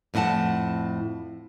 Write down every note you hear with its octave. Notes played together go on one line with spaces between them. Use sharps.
F2 A2 D4 F#5 A5